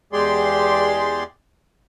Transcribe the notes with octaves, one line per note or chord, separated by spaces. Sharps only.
E2 G#3 G4 G#4 D5 C6